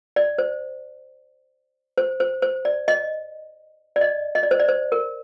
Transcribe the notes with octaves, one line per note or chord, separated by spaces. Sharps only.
D5
C5
C5
C5
C5
D5
D#5
D5
D#5
D#5
D5
C5
D5
C5
A#4